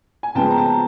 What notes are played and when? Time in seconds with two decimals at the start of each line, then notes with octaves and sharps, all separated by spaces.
0.23 G#5
0.35 C#3 F3 G#3 B3 G5 A5
0.50 A#5
0.57 G5 A5